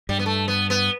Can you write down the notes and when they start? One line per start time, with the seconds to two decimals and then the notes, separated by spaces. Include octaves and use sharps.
0.09 G2 G3
0.19 B3
0.26 A3
0.48 B3
0.70 B3